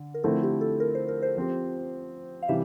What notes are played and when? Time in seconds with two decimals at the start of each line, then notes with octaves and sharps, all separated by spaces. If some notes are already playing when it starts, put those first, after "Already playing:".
Already playing: D3
0.14 A#4
0.23 D3 F3 A3 C4 E4 A4
0.43 G4
0.61 A4
0.80 A#4
0.95 C5
1.08 A#4
1.22 C5
1.37 F3 C4 G4
2.42 F5
2.48 C3 E3 G3 E5